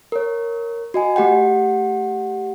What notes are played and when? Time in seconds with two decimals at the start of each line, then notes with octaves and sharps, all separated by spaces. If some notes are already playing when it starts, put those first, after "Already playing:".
0.12 A#4 C#5
0.94 F#4 D#5 G#5
1.16 A3 G4 F#5 G5